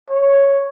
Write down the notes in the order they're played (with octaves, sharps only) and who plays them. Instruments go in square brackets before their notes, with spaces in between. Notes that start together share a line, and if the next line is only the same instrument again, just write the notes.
[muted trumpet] C#5